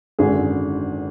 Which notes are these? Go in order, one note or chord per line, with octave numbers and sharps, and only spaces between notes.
G#1 F#2 D3 G#4